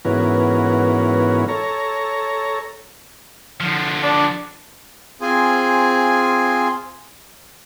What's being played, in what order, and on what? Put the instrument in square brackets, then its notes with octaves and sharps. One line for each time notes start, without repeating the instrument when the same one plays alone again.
[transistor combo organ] G#2 E3 B3 C#4 F#4 A#4
A4 C#5 A#5
[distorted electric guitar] D3 F3
[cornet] D4
[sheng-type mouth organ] C4 F4 G#4 C5 G#5